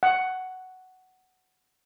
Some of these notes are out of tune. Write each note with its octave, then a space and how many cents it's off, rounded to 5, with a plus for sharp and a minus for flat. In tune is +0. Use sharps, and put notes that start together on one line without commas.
F#5 +5